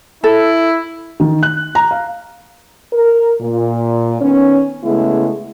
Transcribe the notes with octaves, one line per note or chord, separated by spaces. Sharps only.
E4 A4
D#3
F#6
A#5
F5
A#4
A#2
D#3 B3 C#4
C#3 G#3 A3 B3 E4